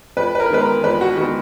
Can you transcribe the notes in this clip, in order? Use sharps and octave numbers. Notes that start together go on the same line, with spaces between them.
F2 B4
B4
A#4
D#3 G#3 B3 B4
A#4
F2 B4
F#4
D#3 G#3 B3 F#4